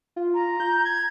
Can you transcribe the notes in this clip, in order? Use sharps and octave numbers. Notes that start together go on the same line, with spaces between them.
F4
A#5
G6
G#6